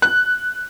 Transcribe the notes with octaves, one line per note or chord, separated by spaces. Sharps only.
F#6